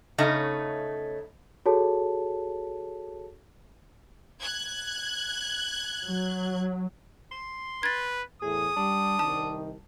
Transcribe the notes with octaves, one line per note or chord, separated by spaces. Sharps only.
C#3 A3 C#4 D#4
F#4 G#4 A4 C#5 A5
F#6 G#6
F#3
C6
B4 G#6 A6
E2 A2 G#4 D#6
G3 D4
C2 D#3 A5